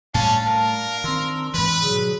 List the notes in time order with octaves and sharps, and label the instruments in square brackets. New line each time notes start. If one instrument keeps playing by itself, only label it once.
[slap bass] A2 G3 [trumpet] C#4 [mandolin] D4 A5 [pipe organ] F5
[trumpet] A#4
[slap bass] D#3 C4 [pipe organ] C6 E6
[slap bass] G#2 E3 [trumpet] B4 [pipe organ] B5
[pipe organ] B2 F#3 G#4 [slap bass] D3